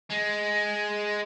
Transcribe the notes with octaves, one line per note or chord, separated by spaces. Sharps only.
G#3